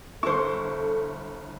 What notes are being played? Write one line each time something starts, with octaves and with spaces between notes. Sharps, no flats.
G1 E4 A4 C5 C#6